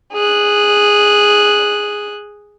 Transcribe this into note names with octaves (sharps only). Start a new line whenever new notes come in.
G#4 F#6